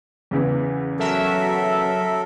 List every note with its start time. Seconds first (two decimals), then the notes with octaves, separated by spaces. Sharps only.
0.31 E2 C#3 E3
0.99 F#3 A4 A#4 E5